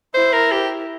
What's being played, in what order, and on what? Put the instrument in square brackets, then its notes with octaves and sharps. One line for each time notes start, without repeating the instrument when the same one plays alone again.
[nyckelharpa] E4 [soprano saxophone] C5
[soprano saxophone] A#4
G4